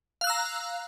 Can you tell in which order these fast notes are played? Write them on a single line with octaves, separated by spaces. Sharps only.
F5 F#6 E6 A#5